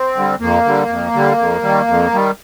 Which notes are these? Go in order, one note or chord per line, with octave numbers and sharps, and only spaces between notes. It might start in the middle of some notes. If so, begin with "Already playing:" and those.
Already playing: C4
D3 G3
F2 A#3
D3 G3
F2
D3 G3
F2
D#3 G3
F2
D#3 G3